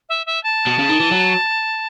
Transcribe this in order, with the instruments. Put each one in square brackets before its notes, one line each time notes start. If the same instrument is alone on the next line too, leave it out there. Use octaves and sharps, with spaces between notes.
[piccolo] E5
E5
A5
[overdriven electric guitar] B2
C#3
D#3
E3
F#3